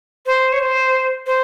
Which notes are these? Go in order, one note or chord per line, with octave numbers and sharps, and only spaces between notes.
C5
C#5
C5
C5